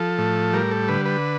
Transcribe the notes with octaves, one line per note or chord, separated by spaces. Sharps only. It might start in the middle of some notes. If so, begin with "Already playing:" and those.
Already playing: F3 A4
A2
G3 A#4
A4
D3 B4
B4